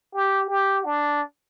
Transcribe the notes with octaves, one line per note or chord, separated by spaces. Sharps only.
G4
G4
D4